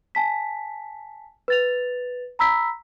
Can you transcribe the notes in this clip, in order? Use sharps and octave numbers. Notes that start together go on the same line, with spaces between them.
G#5 A5 B6
B4 A6 F7
A#5 B5 E6 B6